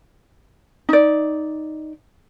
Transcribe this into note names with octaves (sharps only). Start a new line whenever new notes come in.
D#4 D5